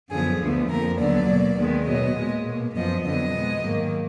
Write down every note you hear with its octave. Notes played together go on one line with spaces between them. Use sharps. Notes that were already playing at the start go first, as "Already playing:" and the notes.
F#2 D3 F3 B3 G#4
D2 D3 F3 B3
F2 F3 A#3 A#4
D#2 D3 F#3 B3 D5
B2 A#3
D#2 D#3 G#3 B3
B2 F#3 B3 D#5
A#2 G#3 B3
B2 A#3
F#2 F3 B3 D#5
F2 D3 F#3 B3 D#5
B2 G#3 B3
G#2 D#3 F#3 A#3